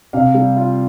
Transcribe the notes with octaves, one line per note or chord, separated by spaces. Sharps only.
C3 F5
G3
F4